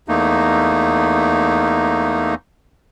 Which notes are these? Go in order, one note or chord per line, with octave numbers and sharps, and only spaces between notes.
E2 A3 A#3 D#4